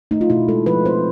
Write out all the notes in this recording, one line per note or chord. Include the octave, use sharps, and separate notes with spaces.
A3 D#4
F4
B2 E4
G#3 A4
F3 B4
C4 C5